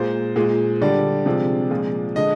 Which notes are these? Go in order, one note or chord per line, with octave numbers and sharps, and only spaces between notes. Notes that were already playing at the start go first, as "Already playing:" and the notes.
Already playing: A#2 G#3 C5
A#2 G#3
D3 G3 D5
C3 F3 G#3
A#2 F3 G#3
D3 G#3 D#5